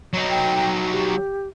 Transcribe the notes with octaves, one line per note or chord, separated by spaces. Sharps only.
F#3 D#4
G5
G4